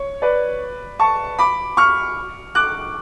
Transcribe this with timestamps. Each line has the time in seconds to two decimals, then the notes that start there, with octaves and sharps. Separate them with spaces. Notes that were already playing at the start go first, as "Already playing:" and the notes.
Already playing: C#5
0.22 B4 D5
0.99 A5 C#6
1.39 B5 D6
1.77 C#6 F6
2.55 D6 F#6